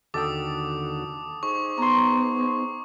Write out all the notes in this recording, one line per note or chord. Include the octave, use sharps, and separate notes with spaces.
D#2 D3 F#4 A4 G5 D6 D#6
D#4 G#4 C5 C#6
B3 A#5 C6